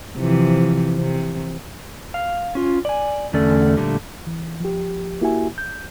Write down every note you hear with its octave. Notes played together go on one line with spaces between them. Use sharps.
C3 E3 F3
C3
F5
C#4 F4
D5 G#5
E2 D3 A3 C#4 A4 D5
A#2 D3 G3 A3
E3
F3 G4
A#3 E4 F#4 G4 E5 G#5
G6